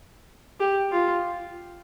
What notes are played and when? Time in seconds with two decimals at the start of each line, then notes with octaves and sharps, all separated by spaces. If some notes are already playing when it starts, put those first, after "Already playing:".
0.60 G4
0.92 F4